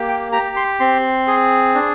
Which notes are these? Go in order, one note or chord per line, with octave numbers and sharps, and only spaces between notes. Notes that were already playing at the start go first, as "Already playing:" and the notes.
Already playing: A#3 G4
G5
G4 A#5
C6
C4 C6
G#4
D4